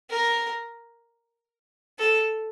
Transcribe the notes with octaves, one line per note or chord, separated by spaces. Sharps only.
A#4
A4